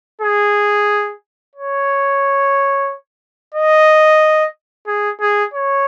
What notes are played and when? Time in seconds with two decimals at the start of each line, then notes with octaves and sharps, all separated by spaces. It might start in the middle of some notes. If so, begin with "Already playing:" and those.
0.21 G#4
1.56 C#5
3.54 D#5
4.87 G#4
5.21 G#4
5.54 C#5